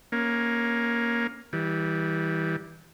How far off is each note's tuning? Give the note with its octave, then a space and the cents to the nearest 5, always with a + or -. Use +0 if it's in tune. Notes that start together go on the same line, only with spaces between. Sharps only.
A#3 +10 C#4 -5
E3 -25 G3 +0